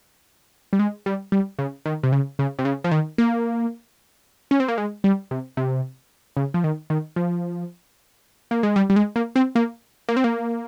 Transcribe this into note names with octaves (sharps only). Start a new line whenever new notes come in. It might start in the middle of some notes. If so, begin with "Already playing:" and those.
G3
G#3
G3
G3
C#3
D#3
C3
C#3
C#3
C3
C#3
F3
D#3
A#3
C#4
C4
A#3
G#3
G3
C3
C3
C#3
F3
D#3
D#3
F3
A#3
G#3
G3
G3
G#3
A#3
C4
A#3
A#3
C4
A#3